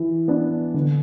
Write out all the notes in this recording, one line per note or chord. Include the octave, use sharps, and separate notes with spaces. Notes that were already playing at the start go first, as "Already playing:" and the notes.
Already playing: E3
B3 D4
D3